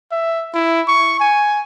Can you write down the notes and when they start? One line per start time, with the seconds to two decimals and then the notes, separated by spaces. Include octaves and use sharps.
0.12 E5
0.54 E4
0.88 C#6
1.20 G#5